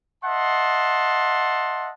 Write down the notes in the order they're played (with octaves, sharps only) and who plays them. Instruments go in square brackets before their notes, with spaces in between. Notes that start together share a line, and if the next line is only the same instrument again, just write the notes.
[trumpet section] D#5 E5 F#5 A5 C6